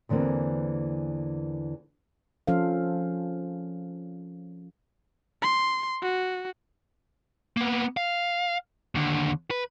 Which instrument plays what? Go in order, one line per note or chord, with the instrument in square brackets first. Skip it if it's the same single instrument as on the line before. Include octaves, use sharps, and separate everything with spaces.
[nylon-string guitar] E2 D3 E3 A#3 C4
[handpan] F3 C#4 A4 C5 F5
[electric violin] C6
F#4
[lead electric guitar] A#3 B3
F5
D#2 D3
B4